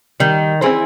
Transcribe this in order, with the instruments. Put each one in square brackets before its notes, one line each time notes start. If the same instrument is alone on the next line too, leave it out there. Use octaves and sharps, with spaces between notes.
[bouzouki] D#3 [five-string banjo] G3
[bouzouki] E3 [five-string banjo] C4 E4 G#4 C5